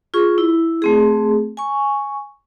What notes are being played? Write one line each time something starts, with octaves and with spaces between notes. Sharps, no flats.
F4 G#4 C#6
E4
A3 C4 G#4
G#5 C#6